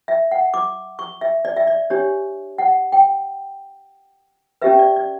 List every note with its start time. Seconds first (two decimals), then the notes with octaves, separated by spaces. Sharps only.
0.08 E5
0.31 F#5
0.54 D6
0.99 C#6
1.21 E5
1.45 D5
1.56 E5
1.67 D5
1.90 D4 G4 C#5
2.58 F#5
2.92 G5
4.62 C#4 G4 B4 E5
4.79 D5
4.96 D5